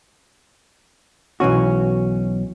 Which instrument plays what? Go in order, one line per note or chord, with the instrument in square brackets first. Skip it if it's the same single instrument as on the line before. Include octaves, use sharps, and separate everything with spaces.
[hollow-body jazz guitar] B1 E3 C#4 F#4